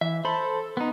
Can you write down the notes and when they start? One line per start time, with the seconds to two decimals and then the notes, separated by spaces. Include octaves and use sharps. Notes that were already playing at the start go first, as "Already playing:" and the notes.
0.01 E3 E5
0.25 A4 C5 B5
0.77 B3 D#4